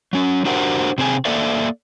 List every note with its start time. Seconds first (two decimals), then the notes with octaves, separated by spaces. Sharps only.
0.13 F#3 C#4
0.45 D4 F#4 G4 A#4 C5 F#5
0.98 C3 C4 G#4 G#5
1.25 A#3 A4 D5 E5